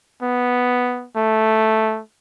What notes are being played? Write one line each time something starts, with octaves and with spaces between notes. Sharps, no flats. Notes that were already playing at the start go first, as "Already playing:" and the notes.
B3
A3